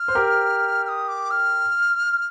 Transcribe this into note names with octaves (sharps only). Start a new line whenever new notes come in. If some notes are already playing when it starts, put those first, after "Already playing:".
Already playing: F6
C5
G4 A#4
F6
D#6
D6
F6